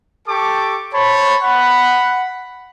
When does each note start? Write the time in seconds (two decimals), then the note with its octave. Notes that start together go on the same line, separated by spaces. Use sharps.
0.28 G4 A4 A5 C#6 D6
0.94 C5 C#5 A5 B5
1.43 F#5 B5